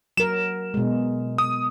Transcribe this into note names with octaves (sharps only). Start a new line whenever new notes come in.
F#3 A#4 E7
B2 G#3
D#6